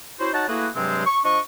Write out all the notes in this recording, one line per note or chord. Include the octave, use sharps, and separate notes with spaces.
C#4 E4 F#4 C5
D#4 F#4 C#5 F#5 A5
A3 A#3 E4 F#4 G#4 B4
G2 C3 F#3 G#3 C4
C#6
F3 D4 D#5 C#6